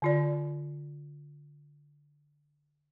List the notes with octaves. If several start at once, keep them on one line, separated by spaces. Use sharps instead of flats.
D3 F4 D5